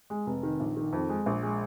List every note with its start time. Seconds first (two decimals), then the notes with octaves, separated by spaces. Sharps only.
0.10 G#3
0.27 F1
0.43 D#3
0.60 A#1
0.77 D#3
0.93 F2
1.10 G#3
1.26 A#1
1.43 G#3